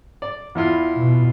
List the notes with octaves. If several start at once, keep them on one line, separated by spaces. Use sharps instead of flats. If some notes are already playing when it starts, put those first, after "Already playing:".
D5
E2 E4 F4
B2